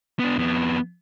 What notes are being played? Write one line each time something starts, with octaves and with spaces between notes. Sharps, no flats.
B3 D4
F2 B3